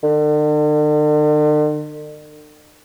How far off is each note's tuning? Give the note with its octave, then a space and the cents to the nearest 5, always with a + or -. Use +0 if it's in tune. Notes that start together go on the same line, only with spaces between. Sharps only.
D3 +45